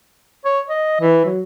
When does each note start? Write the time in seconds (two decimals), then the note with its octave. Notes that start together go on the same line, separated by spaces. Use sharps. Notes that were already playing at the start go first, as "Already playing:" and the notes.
0.45 C#5
0.70 D#5
1.00 E3
1.25 F#3